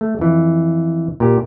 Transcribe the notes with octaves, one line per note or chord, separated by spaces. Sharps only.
A3
F2 E3
A#2 G4